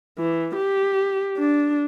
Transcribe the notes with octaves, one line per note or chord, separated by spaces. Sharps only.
E3
G4
D4